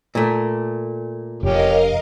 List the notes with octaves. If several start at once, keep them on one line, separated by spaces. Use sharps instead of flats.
A#2 A3
F1 C#4 G4 A#4 D#5 F5